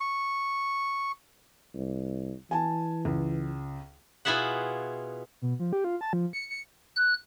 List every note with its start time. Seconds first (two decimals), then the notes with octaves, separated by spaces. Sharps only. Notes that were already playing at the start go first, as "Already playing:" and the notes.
0.01 C#6
1.74 C2
2.51 E3 G#5 A5
3.05 C#2
4.25 B2 E4 F4 G#4 E5 F#5
5.42 B2
5.60 F3
5.73 G4
5.84 F4
6.01 A5
6.13 F3
6.33 C#7
6.50 C#7
6.96 F#6